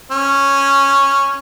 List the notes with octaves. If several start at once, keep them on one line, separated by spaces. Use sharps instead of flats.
C#4